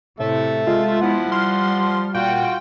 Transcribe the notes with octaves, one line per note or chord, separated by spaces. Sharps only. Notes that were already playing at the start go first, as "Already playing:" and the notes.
A2 C3 A4 E5
G#3 F4
F3 B3 E4 F#5
G3 C6 F6
A#2 F4 F#4 F#5 G5